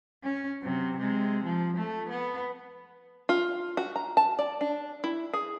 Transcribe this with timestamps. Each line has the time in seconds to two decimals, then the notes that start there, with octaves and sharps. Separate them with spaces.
0.24 C#4
0.63 C3 F#3
0.98 C3 G#3
1.44 F3
1.78 A3
2.10 B3
3.29 F4
3.77 F#4
3.96 A#5
4.17 A5
4.39 D5
4.61 D4
5.04 E4
5.33 G#4